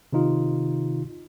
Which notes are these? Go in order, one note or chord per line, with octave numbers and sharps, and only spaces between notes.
C3 D#3 D#4 F4